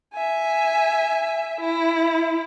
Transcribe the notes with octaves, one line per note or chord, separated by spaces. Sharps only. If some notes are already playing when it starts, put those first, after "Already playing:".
E5 G#5
E4